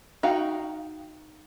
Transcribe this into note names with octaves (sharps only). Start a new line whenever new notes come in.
D#4 F#4 F5 G5